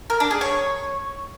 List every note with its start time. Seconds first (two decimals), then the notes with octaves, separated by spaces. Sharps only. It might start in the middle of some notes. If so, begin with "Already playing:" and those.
0.10 A#4
0.20 D4
0.31 G#4
0.41 C#5